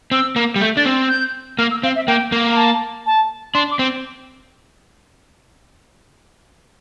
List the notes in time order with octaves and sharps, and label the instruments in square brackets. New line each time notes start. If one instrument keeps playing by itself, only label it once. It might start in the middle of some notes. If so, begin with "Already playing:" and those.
[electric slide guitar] C4 [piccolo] E6
[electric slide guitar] A#3
G3
[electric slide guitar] A3 [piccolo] G6
[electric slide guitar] D4 [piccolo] A6
[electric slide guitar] C4
[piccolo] G6
[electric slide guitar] A#3 [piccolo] F6
[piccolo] E6
[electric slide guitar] C4 [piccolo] F5
[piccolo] E5
[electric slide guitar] A#3 [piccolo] G5
[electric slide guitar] A#3
[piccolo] A#5
A5
A5
[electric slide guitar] D4 [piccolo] C6
[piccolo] D6
[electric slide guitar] C4